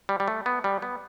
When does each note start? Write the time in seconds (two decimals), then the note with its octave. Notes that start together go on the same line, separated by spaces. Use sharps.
0.09 G3
0.20 G3
0.28 A3
0.46 B3
0.64 G3
0.82 B3